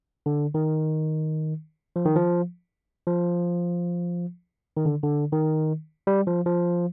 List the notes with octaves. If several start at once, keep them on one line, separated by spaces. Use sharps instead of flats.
D3
D#3
F3
D#3
F3
F3
D#3
D3
D3
D#3
G3
F3
F3